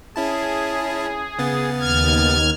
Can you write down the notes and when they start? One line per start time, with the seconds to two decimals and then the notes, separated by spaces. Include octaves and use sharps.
0.16 C#4 E4 G#4 A5
1.39 C#3 B3 A6
1.80 D#2 F6 G#6